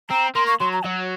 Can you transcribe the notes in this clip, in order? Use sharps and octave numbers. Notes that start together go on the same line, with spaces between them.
C4 A#5
A#3 C6
C#6
F#3 C6
A#5
F#3 C#5